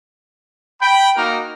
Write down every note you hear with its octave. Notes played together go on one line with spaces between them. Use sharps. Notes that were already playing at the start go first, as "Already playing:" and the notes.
G5 B5
A#3 D#4 F#4 A#4